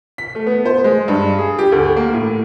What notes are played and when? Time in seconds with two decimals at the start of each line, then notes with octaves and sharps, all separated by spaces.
0.18 B6
0.35 A3
0.46 B3
0.65 C5
0.84 G#3
1.08 G2
1.38 G#4
1.59 G4
1.72 D2
1.96 A#3
2.14 A2